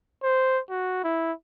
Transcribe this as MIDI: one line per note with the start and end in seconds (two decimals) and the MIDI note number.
0.23 0.59 72
0.70 1.02 66
1.04 1.32 64